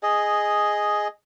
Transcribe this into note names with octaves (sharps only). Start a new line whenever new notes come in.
G#4 D#5